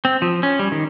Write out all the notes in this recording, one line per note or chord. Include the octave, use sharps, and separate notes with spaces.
C4
F3
C#4
G3
D#3